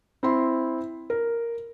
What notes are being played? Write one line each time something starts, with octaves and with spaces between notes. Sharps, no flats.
C4 E4 C6
A#4